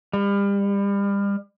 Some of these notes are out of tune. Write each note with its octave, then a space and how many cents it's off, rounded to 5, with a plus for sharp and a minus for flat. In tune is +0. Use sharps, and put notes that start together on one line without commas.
G3 +35